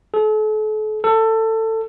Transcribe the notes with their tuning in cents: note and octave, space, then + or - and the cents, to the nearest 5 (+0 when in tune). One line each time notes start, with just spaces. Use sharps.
A4 -40
A4 +20